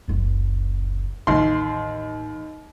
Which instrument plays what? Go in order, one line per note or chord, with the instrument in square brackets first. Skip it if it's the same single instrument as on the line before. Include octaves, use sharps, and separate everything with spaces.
[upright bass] F#1 C#2
[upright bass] A1 [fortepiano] D#2 C6